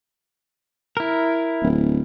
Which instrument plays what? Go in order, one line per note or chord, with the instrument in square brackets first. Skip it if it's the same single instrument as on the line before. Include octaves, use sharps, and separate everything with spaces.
[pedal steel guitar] E4 A#4
[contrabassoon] D1